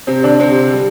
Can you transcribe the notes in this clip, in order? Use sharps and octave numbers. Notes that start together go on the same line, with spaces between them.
C3 C4
D3 D4
C3 C4
G3